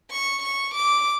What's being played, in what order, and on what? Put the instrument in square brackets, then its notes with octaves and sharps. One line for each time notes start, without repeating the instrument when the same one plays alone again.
[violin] C#6
C#6
D6